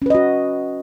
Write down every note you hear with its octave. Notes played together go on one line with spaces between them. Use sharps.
C#4 F#4 B4 D#5